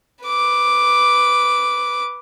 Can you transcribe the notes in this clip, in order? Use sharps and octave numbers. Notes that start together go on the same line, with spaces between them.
B4 D6